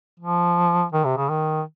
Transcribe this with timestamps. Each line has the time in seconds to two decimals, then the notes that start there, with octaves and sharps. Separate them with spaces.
0.19 F3
0.92 D#3
1.05 C3
1.17 C#3
1.29 D#3